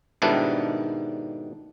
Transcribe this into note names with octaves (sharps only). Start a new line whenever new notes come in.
G#2 B2 D#3 G3 D4 E4